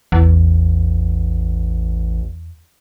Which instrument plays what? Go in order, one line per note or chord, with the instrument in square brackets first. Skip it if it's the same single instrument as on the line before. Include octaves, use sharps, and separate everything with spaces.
[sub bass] A1 [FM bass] E2